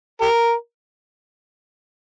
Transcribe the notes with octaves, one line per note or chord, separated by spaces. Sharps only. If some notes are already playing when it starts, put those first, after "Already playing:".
G4 A#4